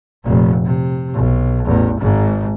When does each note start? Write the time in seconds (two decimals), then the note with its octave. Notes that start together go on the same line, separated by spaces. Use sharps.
0.24 F1 A#2
0.65 C3
1.14 B1
1.65 A1 E2
2.00 G#1 G#2